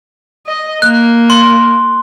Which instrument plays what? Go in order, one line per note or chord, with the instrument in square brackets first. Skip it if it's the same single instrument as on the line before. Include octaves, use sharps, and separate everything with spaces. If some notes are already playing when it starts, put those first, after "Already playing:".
[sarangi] D#5
[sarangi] A#3 [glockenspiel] F#6
[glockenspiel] C6